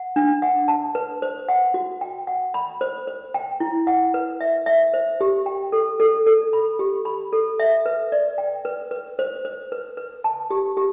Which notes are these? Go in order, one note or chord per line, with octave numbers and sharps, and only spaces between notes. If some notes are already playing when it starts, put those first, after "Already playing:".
Already playing: F#5
D4
F#5
A5
B4
C5
F#5
F#4
G5
F#5
B5
C5
C5
G5
E4
F#5
B4
E5
E5
C5
G4
G5
A4
A4
A4
B5
G4
B5
A4
E5
B4
D5
G5
B4
B4
C5
C5
B4
B4
A5
G4
G4